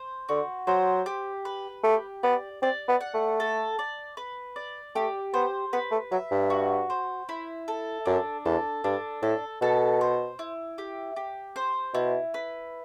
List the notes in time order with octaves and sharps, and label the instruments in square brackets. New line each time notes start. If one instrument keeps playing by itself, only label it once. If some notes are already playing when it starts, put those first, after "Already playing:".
Already playing: [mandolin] C5
[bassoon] D3 [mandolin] F#4
[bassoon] F#3 [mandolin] C5
[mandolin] G4
B4
[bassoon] A3 [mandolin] G4
[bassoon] B3 [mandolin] D5
[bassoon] C4 [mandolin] D5
[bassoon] B3
[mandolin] F#5
[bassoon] A3
[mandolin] A4
D5
B4
D5
[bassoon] A3 [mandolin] G4
[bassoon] B3 [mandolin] C5
[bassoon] B3 [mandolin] B4
[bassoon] A3
[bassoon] F#3 [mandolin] E5
[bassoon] G2
[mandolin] F#4
C5
E4
A4
[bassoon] F#2 [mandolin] D4
[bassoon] E2 [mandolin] A4
[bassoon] G2 [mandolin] D4
[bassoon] A2 [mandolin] A4
[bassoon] B2 [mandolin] A4
[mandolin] C5
E4
G4
G4
C5
[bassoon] B2 [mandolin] E4
[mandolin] B4